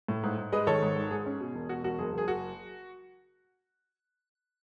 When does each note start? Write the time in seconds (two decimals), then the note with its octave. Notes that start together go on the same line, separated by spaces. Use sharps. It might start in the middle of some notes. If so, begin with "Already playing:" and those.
0.08 A2
0.23 G#2
0.38 G#2
0.52 G#3 B4 D#5
0.67 D#3 A4 C#5
0.82 G#2
0.96 G#1
1.11 G#2 G#4
1.26 C#4
1.40 B2
1.55 E1
1.69 B2 F#4
1.84 E1 F#4
1.98 F#1 G#4
2.13 F#1 G#4
2.28 F#4